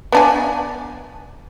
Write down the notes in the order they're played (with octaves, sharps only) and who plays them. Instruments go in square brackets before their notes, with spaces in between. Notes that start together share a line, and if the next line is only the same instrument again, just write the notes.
[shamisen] B3 D4 G#5